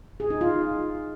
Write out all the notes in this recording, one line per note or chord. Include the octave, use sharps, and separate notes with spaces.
G#4
D#4
F4